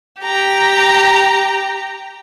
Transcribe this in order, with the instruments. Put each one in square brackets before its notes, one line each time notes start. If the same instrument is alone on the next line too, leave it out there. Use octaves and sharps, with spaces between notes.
[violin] G4 A#5